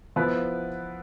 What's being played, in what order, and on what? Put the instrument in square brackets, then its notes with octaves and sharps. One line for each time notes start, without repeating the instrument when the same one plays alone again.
[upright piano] F3 B3 E4 B4